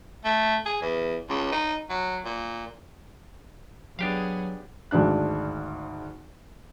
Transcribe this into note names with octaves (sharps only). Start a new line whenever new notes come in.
A3
G#4
E2
C#2
D#4
F#3
A#2
F#3 B3 D4 G4 G#4 F5
G#1 D2 G#2 D4 F#6